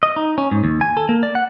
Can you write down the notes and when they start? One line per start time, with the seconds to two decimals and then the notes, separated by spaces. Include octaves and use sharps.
0.03 D#5
0.16 D#4
0.38 C#4
0.51 G#2
0.64 D#2
0.81 G#5
0.97 A4
1.09 A#3
1.23 D5
1.35 F#5